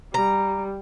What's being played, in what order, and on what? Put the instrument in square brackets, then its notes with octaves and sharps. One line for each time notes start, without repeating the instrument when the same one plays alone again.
[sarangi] G3 [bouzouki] A#5